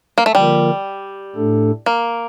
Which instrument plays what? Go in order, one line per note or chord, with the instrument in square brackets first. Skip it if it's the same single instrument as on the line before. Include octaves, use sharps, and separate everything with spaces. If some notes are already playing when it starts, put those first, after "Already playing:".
[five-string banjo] A#3
A3
[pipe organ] D3 F3 A#3 F4 A#4 [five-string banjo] G3
[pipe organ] A2 A3 D4 A4
[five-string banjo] A#3